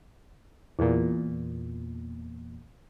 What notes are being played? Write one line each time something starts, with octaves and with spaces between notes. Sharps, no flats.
E2 A#2